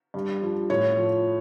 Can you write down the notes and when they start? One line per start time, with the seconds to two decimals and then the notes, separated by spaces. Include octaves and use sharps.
0.14 G2
0.42 F3
0.70 A2 C#5
0.97 F3